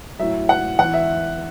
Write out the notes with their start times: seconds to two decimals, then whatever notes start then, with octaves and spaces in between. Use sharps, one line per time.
0.19 A2 F#3 E5
0.49 F#5
0.79 E2 E3 F#5
0.94 E5